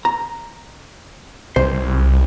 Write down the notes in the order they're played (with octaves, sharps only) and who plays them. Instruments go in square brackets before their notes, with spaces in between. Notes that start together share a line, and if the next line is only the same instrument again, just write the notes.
[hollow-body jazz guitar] A#5
[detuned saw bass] C2 [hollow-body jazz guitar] C5